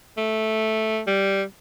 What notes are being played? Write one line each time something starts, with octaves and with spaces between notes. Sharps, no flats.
A3
G3